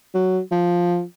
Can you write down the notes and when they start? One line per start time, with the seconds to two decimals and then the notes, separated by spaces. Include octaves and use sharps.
0.14 F#3
0.51 F3